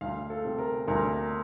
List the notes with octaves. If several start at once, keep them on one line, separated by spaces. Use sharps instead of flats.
D2 F5
A4
C3
A#4
D2 A#4